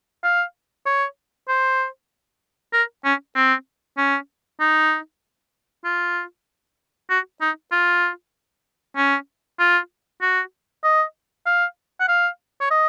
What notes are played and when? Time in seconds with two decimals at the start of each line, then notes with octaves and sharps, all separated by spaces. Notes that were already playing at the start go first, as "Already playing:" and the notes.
0.24 F5
0.86 C#5
1.48 C5
2.73 A#4
3.04 C#4
3.35 C4
3.97 C#4
4.60 D#4
5.85 F4
7.10 F#4
7.41 D#4
7.72 F4
8.96 C#4
9.59 F4
10.21 F#4
10.84 D#5
11.46 F5
12.00 F#5
12.08 F5
12.61 C#5
12.71 D#5